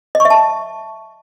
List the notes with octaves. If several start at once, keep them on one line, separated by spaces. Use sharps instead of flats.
D#5
C#6
E5
A5